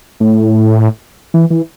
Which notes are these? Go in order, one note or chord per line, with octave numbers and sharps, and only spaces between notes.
A2
E3
E3